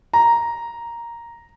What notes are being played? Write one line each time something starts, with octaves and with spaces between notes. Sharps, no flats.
A#5